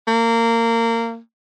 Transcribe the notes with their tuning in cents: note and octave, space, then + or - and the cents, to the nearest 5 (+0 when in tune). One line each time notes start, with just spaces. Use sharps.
A#3 -25